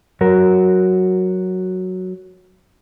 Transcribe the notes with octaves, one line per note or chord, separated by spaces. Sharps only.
F#3 F#4 A#4